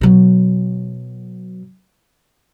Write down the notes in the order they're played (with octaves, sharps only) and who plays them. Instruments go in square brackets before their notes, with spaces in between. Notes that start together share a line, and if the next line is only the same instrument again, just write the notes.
[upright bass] B2 F#3